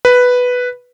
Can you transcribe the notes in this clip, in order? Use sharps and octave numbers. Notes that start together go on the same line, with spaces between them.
B4